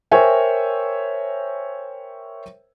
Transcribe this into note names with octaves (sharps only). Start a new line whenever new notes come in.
A#4 C5 C#5 E5 G5 G#5